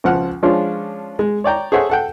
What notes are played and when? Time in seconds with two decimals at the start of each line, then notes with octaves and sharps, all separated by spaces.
0.04 C#2 F3 F#5 F6
0.43 F3 G#3 C#4 D4 F4
1.19 G#3
1.44 C#5 D5 G5 A#5
1.72 G#4 A4 C5 C#5 E5 F#5
1.90 A4 F#5 G5